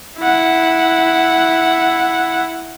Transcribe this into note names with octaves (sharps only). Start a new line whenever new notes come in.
E4 F#5